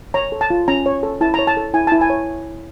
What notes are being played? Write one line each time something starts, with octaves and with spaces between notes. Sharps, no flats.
C#5 A#5
A4
A5
F4
C#4 A#5
C#5
A4
E4 A5
C#5 A#5
A5
A4
E4 G#5
E4 A5
G#5
C#5